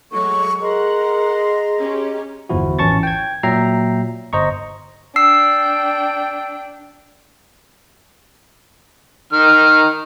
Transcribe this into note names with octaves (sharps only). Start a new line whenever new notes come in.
F#3 G#3 A3 A4 C#6
G#4 A#4 D#5 F#5 A#5 C6
C#4 G4
G1 E2 F3 E4 F#4
A1 E3 C#4 A5 C#6 A6
G5 G#6
A#2 F#3 E5 G5 A#5 C7
G1 C5 D#5 A#5 C#6
D4 G5 E6 C7
D#3 F6